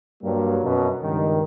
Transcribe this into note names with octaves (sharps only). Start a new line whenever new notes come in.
G2 F#3 G3 A#3
F#2 B2
C#2 G2 D#3